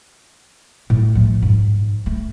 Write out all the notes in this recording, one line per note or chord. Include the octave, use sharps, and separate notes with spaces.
A2
F3 A3
G#2
A3